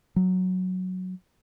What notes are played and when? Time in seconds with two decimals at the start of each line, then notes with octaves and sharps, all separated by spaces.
0.16 F#3